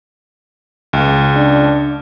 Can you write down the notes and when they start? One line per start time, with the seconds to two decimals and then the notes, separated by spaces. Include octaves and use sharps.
0.93 C#2
1.36 D4